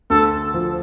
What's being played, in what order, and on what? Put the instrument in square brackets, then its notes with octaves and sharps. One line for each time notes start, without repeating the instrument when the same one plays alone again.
[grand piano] D2 [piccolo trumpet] A4
[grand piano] F3